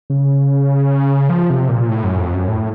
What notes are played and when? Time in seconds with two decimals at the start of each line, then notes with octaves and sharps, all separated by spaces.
0.10 C#3
1.29 F3
1.50 C3
1.69 A#2
1.89 A2
2.04 F#2
2.18 F2
2.34 F#2
2.48 A2